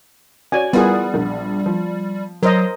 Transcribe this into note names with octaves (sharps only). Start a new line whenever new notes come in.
F#4 C#5 D5 G#5
G3 B3 E4 F4 G#4 A#4
A#1
F3
F#3 A#4 C5 D#5